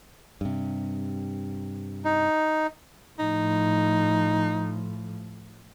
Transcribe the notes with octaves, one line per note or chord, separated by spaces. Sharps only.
G2 C3
D#4
A2 F3 D#4